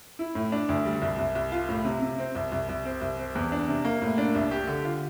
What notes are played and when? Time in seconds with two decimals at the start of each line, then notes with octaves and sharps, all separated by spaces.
0.19 E4
0.35 A2
0.52 D4
0.69 D2
0.85 G3
1.02 C2
1.18 C2
1.35 C2
1.52 F4
1.69 A2
1.85 C3
2.02 C3
2.19 C4
2.35 C2
2.52 C2
2.69 C2
2.85 C4
3.01 C2
3.18 C4
3.35 E2
3.52 D4
3.68 C3
3.85 A#3
4.02 A2
4.18 D4
4.35 C2
4.51 G4
4.67 D3
4.85 F4